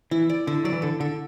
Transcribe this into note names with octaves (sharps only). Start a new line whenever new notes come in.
E3 E4
D5
D3 E4
F#3 D5
E3
D3 A4
D3 A4